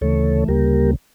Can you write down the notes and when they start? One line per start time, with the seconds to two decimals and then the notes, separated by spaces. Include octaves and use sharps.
0.01 D2 C#3 E3 A3 A4 C#5
0.48 D2 C#3 G3 A#3 G4 A#4